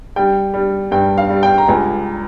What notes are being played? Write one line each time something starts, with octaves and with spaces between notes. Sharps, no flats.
G3 G5
G3
G2 G5
F5
G3
G5
A#5
C#2 G#5